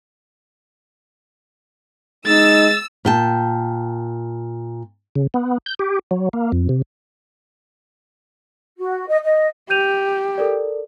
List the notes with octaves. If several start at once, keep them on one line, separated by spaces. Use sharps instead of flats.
G#3 D#4 E6 A6
A#2 G5 A5
C#3
B3
G6
G4
F#3
A#3
F2
C3
F#4
D#5
D#5
G4 G6 D#7 F7
A4 A#4 D5